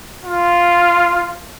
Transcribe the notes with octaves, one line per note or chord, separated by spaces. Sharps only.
F4